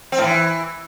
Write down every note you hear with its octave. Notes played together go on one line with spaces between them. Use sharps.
C4
A2
E3